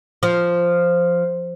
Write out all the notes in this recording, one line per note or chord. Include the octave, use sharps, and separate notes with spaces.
F3